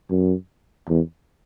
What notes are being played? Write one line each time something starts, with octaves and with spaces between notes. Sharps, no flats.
F#2
E2